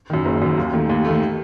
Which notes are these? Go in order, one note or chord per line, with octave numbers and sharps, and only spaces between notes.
F#2 D#3
F#1
F#2 D#3
D#2
D#3 A3
D#2
D#3 A3